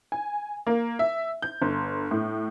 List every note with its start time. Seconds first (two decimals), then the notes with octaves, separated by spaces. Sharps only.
0.12 G#5
0.67 A#3
0.99 E5
1.42 G6
1.62 G1
2.11 A2